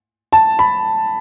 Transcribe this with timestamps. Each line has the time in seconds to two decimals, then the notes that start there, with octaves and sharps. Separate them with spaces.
0.33 A5
0.59 B5